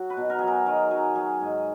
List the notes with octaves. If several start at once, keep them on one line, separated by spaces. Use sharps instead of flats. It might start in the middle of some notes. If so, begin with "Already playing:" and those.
Already playing: F#3 F#4
B4
B2
A#4
F#3 G#4
A#4
D#3 A#4
F#3 G#4
F#3 G#4
G#2